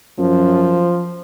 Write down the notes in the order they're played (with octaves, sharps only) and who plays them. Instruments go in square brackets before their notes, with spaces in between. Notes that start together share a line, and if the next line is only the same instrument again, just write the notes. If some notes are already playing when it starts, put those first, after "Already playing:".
[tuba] F#2 [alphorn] F3